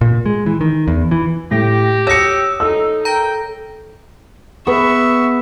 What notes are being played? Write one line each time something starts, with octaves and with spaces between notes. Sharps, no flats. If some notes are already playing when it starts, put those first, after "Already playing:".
A#2
G#3
E3
D#3
E2
E3
A2 G4 A#6
C#5 D#6 E6 A#6 C#7
A3 D#4 A4 E6
A#4 G5 A#5 A#6
B3 G#4 B4 E5 C#6